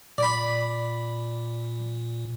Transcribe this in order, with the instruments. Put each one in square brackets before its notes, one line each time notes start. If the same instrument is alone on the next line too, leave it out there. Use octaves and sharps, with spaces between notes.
[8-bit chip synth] A#2 [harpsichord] D5 B5